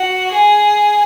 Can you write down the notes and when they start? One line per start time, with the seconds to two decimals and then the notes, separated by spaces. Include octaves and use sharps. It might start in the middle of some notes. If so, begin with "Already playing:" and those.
Already playing: F#4
0.31 G#4